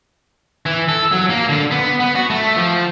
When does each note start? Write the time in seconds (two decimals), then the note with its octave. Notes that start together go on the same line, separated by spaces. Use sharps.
0.66 E3
0.89 A4
1.12 F#3
1.29 A#3
1.49 D3
1.71 B3
2.00 B3
2.16 F#4
2.30 A3
2.56 F3